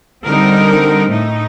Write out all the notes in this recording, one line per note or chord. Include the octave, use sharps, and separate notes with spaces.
D3 G3 C4 D#4 A#4
A2 A3 D#4